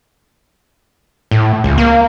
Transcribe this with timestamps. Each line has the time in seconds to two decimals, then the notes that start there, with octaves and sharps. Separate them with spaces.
1.31 A2
1.64 C#2
1.78 A#3